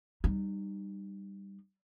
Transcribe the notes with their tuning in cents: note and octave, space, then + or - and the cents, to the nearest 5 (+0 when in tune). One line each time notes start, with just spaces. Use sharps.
G3 +0 D#4 -35